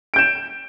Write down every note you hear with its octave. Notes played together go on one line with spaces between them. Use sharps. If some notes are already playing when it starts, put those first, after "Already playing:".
G6 D7 E7